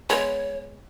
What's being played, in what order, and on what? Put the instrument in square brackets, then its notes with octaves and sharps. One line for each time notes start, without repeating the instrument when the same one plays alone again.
[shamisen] G#3 B3 [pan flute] C#5